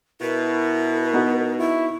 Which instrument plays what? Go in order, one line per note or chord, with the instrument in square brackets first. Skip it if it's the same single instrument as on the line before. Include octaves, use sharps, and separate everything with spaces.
[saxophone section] B2 [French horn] E4 [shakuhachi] A#4
[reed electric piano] B3 D#4 F#4
[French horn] E4 [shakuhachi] C#6